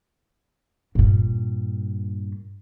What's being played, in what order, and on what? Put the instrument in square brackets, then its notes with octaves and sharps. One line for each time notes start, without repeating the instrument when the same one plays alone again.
[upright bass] G2 A#2